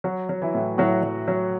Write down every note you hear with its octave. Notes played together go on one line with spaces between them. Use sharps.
F#3 F#4
F#3
E3 E4
A2
A2 F#3 F#4
F#3
F#3